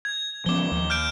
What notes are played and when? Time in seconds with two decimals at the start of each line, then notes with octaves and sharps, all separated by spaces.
0.05 G#6
0.46 F3 B3 C#4 D6 G7
0.72 D#2
0.90 F6 G6 D7